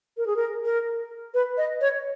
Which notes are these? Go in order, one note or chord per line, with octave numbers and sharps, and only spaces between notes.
A#4
G#4
A#4
A#4
B4
D#5
C#5